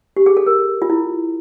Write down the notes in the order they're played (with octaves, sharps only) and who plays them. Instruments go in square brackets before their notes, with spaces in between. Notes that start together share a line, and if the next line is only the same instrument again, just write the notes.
[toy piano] G4
G#4
A4
A#4
F4
E4